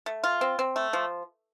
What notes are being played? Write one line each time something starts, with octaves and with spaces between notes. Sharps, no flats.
A3
F4
C4
C4
A3
F3